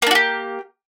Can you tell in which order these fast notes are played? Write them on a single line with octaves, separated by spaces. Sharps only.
A#3 D4 F#4 G4